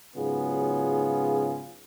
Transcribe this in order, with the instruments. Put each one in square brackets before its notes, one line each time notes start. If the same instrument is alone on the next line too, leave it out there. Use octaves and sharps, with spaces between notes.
[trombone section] G#2 C#3 F#3 B3 F4 G#4